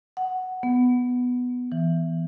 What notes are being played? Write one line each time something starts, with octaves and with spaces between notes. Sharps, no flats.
F#5
B3
E3